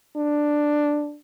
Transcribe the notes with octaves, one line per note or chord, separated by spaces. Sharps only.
D4